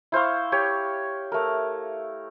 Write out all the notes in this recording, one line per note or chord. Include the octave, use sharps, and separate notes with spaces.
E4 C5 F5 C#6
G4 C#5
A3 A#4